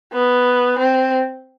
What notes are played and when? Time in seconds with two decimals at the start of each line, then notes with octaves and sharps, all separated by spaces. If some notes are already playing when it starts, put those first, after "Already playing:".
0.13 B3
0.79 C4